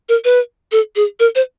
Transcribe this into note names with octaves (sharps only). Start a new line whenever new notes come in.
A#4
B4
A4
G#4
A#4
C5